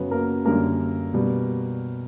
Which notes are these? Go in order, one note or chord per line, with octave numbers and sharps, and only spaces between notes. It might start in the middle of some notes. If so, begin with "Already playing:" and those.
Already playing: F#2 C#3 F#3 B3 B4
A#3 A#4
F#2 D3 G3 A#3 A#4
B2 G3